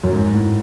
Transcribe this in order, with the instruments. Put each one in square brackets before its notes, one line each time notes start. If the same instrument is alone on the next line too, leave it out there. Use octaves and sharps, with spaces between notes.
[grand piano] F#2
G#2
A2